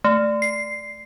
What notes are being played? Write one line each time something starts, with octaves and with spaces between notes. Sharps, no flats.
A3
C7